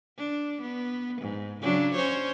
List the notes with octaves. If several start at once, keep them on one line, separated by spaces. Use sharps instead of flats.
D4
B3
G#2
C#3 F#3 D4
C#4 C5 C#5